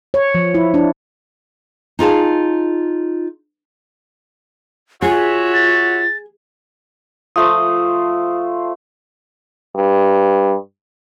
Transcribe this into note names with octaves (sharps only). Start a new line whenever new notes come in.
C#5
F3
E4
D4
D#4 F4 G#4 A5
F4 F#4 G#4 C#5 E5
A6
F3 A3 C5 D#6
G2